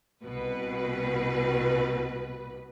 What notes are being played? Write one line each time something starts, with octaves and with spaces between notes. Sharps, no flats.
C2 B2 B4